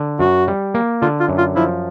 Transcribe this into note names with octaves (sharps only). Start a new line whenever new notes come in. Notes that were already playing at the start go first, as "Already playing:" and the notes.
Already playing: D3
F#2 F#4
G3
A#3
D3 F4
F4
F#2
F4
F3 E4